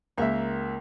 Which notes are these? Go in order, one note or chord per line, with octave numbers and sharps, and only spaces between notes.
C#2 A#3 A#4 E5 F5